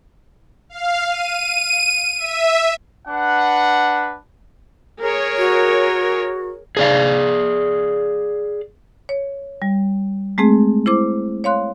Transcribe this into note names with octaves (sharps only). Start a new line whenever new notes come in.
F5
D#7
E5
D4 B4 F#5
G#4 A#4 C#5
F#4
G#4 D5 F5
C#5
G3
G#3 A3 C4 G#4
E4 C5 D6
C#5 F5 C6 F#6